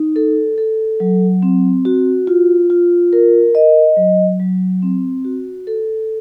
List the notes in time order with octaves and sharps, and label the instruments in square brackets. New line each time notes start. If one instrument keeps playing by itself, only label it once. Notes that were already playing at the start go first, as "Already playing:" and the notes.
Already playing: [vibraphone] D#4
A4
A4
F#3
C4
F#4
F4
F4
A#4
D#5
F#3
F#3
C4
F#4
A4